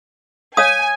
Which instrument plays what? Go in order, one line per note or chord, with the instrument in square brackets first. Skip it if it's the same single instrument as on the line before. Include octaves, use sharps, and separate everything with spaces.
[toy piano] C#5 F5 D#6 [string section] G#5